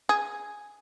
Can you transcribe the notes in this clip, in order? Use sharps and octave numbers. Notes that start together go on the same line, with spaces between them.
G#4